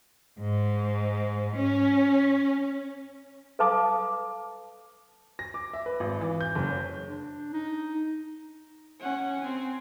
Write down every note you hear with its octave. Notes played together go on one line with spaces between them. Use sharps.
G#2
C#4
A4 B4 F5 A5 D6 D#6
A#6
D6
E5
B4
G#1
E3
G6
F#1
C#5
D4
D#4
C#4 F#5
C4 G#5